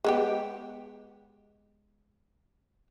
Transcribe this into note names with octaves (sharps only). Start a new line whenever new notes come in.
G#3 B3 G4